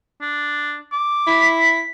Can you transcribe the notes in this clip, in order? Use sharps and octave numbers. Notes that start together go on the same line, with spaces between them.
D4
D6
E4 B6